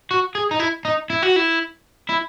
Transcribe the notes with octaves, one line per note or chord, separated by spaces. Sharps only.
F#4
G#4
D#4
E4
D#4
E4
F#4
E4
E4